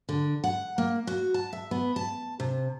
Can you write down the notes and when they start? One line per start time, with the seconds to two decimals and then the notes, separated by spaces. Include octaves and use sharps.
0.09 D3
0.44 F#5
0.78 A#3
1.07 F#4
1.34 A5
1.53 E5
1.71 B3
1.96 A5
2.40 C3